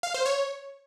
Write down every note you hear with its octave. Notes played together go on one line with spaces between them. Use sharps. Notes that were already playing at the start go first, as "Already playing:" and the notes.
F5
C5
C#5